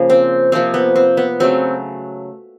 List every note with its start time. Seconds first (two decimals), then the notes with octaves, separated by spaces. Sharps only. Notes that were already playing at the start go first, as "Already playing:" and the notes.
Already playing: C#3 F3 A#3
0.10 C4
0.52 C3 F3 A#3 C4
0.74 B3
0.96 C4
1.17 B3
1.40 C#3 F#3 A3 C4